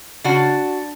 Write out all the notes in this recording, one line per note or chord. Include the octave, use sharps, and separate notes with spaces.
C#3 D4 F#4